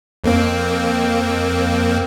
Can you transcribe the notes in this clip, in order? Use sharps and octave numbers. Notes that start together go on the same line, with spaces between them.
F2 A#3 C4